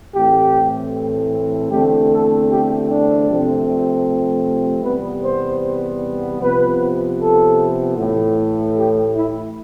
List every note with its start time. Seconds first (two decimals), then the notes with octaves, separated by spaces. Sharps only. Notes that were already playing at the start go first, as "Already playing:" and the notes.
0.14 A2 E3 A3 C4 G4
1.70 E2 D3 A3 C4 G4
2.11 A4
2.50 G4
2.88 D4
3.27 C3 F3 A3 C4
4.84 E2 C3 G3 B3 B4
5.23 C5
6.40 C3 F3 B3 B4
7.20 A4
7.97 A2 E3 A3
8.76 G4
9.15 E4